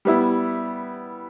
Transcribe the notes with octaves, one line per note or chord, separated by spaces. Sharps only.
G3 B3 E4